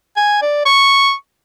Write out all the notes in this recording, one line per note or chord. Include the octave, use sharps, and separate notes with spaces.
G#5
D5
C#6